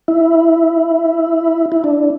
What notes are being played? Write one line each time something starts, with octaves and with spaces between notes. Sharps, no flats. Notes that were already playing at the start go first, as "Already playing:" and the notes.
E4
E4
D4